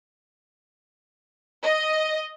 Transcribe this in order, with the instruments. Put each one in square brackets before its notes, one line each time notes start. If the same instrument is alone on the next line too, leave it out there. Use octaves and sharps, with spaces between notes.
[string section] D#5